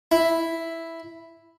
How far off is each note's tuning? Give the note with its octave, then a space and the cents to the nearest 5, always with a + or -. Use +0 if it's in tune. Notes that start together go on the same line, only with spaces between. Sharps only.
E4 +0 B5 +5